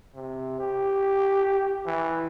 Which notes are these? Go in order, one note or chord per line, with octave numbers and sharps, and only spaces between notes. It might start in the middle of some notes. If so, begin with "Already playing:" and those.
C3
G4
E3